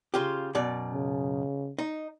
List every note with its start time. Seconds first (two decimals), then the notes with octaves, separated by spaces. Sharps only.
0.14 C#3 F4 G4
0.55 F#2 B2 D5
0.93 C#3
1.79 D#4